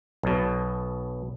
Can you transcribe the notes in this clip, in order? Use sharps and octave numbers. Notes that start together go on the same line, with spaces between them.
B1 B2